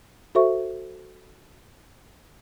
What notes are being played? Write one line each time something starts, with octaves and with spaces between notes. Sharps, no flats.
F#4 A4 C5 E5 C#6